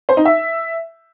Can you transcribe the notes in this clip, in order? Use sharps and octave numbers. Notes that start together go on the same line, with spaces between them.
C5
D#4
E5